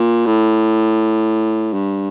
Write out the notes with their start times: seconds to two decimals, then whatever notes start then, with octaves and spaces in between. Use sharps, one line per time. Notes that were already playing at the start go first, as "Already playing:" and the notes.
Already playing: A#2
0.26 A2
1.74 G2